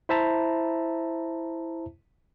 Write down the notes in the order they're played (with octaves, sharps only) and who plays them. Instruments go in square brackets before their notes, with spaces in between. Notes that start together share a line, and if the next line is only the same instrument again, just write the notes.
[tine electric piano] E4 C5 E5 A5 A#5